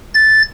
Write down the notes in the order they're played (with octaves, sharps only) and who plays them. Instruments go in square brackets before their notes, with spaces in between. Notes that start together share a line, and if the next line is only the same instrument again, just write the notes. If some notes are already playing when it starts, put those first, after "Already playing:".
[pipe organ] A6